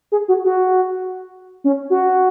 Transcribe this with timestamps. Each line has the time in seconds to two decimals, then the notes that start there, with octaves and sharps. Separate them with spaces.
0.12 G#4
0.28 F#4
0.45 F#4
1.64 C#4
1.90 F#4